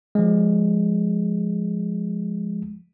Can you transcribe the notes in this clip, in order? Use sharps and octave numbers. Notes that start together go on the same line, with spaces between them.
F3 G#3